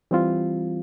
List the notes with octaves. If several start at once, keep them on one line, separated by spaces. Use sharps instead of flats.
E3 G3 C4 F4